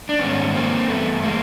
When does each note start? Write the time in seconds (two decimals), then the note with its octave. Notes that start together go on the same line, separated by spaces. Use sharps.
0.09 D4
0.19 G#2 D#3 G3 B3 C#4
0.54 A#3 C4
0.88 G2 E3 G3 A3 B3
1.23 G#3 A#3